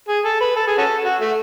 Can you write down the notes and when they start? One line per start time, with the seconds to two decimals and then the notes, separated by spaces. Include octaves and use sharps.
0.08 G#4
0.24 A4
0.40 B4
0.56 A4
0.67 G#4
0.78 C#4 F#4 A4
1.05 F#4
1.21 A3